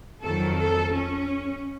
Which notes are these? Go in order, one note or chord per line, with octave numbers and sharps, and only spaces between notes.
F2 D#3 F#3 A4
A4
C#4